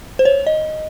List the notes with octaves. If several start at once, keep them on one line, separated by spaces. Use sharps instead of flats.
C5
C#5
D#5